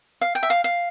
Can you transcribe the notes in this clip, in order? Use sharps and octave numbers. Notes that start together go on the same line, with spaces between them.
F5
G5
E5
F5
F5